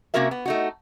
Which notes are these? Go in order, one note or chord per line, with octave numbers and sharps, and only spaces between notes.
C3 A#3 C#4 F#4 A#4 E5
B3
A3 D#4 F#4